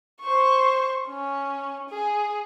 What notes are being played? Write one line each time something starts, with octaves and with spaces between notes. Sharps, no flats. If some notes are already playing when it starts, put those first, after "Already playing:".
C5 C#6
C#4
G#4